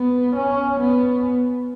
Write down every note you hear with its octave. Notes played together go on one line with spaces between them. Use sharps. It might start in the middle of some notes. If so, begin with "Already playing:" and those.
Already playing: B3
C#4
B3